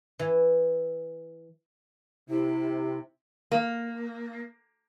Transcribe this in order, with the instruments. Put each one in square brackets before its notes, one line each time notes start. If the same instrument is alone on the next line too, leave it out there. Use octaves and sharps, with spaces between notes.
[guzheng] E3
[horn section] C3 [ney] E4
[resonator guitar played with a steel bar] A#3